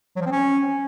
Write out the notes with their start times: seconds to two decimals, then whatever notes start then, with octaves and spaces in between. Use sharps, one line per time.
0.16 F#3
0.21 F3
0.26 C4
0.31 C#4